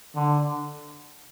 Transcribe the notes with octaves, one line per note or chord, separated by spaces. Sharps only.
D3